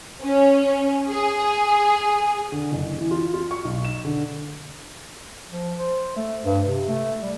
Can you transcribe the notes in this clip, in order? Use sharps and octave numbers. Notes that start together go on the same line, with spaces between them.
C#4
G#4
D3
F#1
E3
F4
F4
C#6
B1
E7
D3
F3
C5
A3
G2
C3
A3
G3